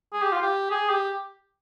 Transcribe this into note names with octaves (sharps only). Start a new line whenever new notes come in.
G#4
G4
F4
G4
G#4
G4